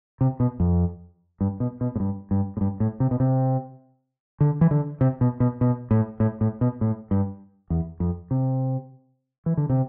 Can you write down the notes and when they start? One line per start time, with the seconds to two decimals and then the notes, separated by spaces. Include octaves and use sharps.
0.21 C3
0.40 B2
0.60 F2
1.41 G2
1.60 B2
1.81 B2
1.96 A2
2.00 G2
2.31 G2
2.57 A2
2.61 G2
2.80 A2
3.00 C3
3.11 B2
3.20 C3
4.41 D3
4.61 E3
4.71 D3
5.01 C3
5.21 B2
5.40 B2
5.61 B2
5.91 A2
6.20 A2
6.41 A2
6.61 B2
6.81 A2
7.11 G2
7.70 E2
8.00 F2
8.31 C3
9.46 E3
9.57 D3
9.70 C3